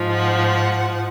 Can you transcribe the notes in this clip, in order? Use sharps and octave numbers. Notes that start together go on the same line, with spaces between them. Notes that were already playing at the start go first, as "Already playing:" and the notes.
Already playing: G#2 F3
F#5